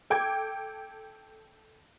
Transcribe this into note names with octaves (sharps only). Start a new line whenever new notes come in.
A4 G5 D6 G#6